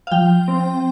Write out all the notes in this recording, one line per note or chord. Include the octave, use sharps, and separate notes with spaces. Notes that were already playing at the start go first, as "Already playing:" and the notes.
F5
F3 G5
C4